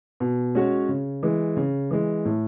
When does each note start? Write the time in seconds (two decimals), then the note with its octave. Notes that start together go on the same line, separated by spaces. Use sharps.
0.20 B2
0.55 G#3 C#4 F#4 C#5
0.89 C#3
1.23 E3 G#3
1.57 C#3
1.91 E3 G#3
2.25 A2